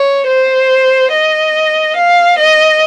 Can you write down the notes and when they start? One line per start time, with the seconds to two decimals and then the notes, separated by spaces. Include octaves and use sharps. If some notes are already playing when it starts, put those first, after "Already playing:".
Already playing: C#5
0.27 C5
1.11 D#5
1.96 F5
2.38 D#5